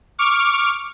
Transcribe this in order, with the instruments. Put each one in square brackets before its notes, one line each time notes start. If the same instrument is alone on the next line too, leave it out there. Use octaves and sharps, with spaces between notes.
[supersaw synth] C#6 D6 F6